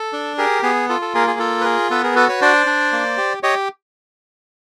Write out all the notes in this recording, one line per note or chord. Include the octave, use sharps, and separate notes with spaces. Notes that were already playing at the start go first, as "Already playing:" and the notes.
Already playing: A4
D4
G4 G#4 A#4
B3 G#4
F4 A4
A4
A#3 G#4 A#4
G#4
F4 A4
B4
G#4 A#4
B3 A4 B4
G#4 A#4
F#4 A4 B4
B4 C#5
D4 C5 D5
D4
A#3
G4
G4 C#5 D#5